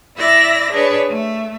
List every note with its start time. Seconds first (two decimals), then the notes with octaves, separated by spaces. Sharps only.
0.17 E4 D5 E5 E6 A#6
0.72 D4 G#4 B4 C#5
1.08 A3 E5